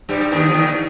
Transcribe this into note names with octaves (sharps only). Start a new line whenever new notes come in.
G2 G3
D#2 D#3
F3
D#2 D#3